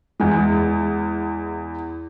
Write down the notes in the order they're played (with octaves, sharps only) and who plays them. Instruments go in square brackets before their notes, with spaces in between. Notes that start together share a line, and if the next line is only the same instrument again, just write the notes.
[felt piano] E2 G#3